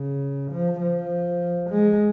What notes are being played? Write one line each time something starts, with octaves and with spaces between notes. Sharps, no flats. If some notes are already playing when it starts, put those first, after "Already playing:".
Already playing: C#3
F3
F3
G#3